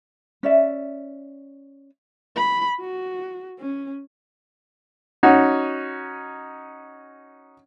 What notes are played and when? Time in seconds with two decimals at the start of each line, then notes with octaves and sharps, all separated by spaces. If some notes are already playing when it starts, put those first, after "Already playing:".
0.43 C#4 D5 E5
2.36 B5
2.80 F#4
3.59 C#4
5.23 C#4 D#4 F#4